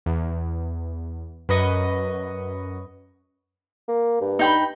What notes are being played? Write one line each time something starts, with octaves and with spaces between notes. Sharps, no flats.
E2
F#2 B4 D#5 C#6
A#3
G2
D#4 G5 B5